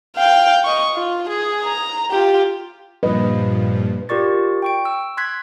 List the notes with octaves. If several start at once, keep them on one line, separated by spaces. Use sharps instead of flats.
F5 G5
D#5 C#6
F4
G#4
A#5
F4 G4
G2 A#2 F3 B4 D#5
F4 G4 A#4 D5 C#6 A6
G5 C#6 D7
E6
C6 F#6 G#6 B6